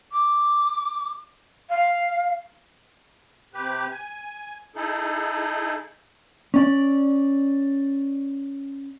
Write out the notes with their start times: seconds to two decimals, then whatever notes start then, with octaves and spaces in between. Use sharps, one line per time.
0.12 D6
1.70 F5
3.54 C3 G4 B4
3.91 G#5
4.75 D#4 E4 G#4 A4
6.54 C#4 D5